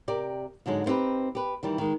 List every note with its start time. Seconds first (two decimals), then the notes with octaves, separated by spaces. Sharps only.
0.08 C3 G4 A#4 D5
0.66 G#2 D3 F#3 G#3
0.86 B3 C4 D#4 G4 B4
1.35 G4 B4
1.63 D#3 E3 G3
1.78 D#3 G#3